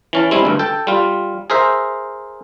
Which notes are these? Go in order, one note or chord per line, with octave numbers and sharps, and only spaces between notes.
E3 C#4 A5
G3 G#3 C4 E4
D2 G2
A4 G5
G3 F4
G#4 A#4 C5 E5